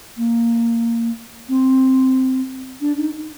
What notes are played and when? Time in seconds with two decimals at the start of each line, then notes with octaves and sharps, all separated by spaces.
0.17 A#3
1.48 C4
2.81 D4
2.97 D#4